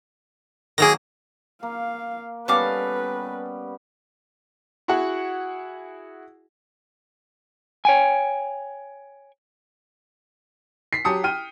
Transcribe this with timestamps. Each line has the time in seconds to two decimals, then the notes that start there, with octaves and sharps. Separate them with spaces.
0.78 D#3 F#3 A#3 G#4 A#6
1.63 A#3 F5
2.48 G3 B3 C#4 A4 B4 F5 D6
4.88 E4 F#4 G#4 F#5
7.85 C#5 G5 G#5
10.93 B6 C7
11.05 F#3 G4 A5 D#6 C#7
11.24 G5 F6 D#7